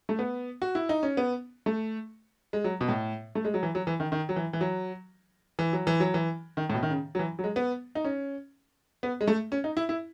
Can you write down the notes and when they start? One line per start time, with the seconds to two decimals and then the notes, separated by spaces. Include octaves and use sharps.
0.09 A3
0.19 B3
0.62 F#4
0.75 E4
0.89 D#4
1.03 C#4
1.17 B3
1.66 A3
2.53 G#3
2.64 F#3
2.81 B2
2.89 A2
3.35 A3
3.45 G#3
3.54 F#3
3.63 E3
3.75 F#3
3.87 E3
4.00 D#3
4.12 D#3
4.29 F#3
4.36 E3
4.53 E3
4.61 F#3
5.59 E3
5.73 F#3
5.87 E3
6.00 F#3
6.14 E3
6.57 D#3
6.70 A2
6.74 B2
6.83 D#3
6.91 C#3
7.15 F#3
7.19 E3
7.39 F#3
7.44 G#3
7.56 B3
7.95 D#4
8.05 C#4
9.03 B3
9.21 G#3
9.28 A3
9.52 C#4
9.64 D#4
9.77 E4
9.89 E4